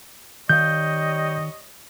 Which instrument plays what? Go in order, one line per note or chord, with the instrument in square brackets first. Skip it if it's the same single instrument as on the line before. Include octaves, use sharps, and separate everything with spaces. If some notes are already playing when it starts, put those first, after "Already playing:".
[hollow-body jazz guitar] D#3 F5 [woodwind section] G3 C#5 D#5 [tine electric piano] G6